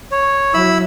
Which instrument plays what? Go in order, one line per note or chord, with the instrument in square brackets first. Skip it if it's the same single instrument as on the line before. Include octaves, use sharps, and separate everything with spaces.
[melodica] C#5
[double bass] F#3 [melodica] E4 B5 E6